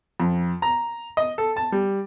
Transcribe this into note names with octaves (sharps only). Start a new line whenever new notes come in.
F2
A#5
D#5
A4
A5
G3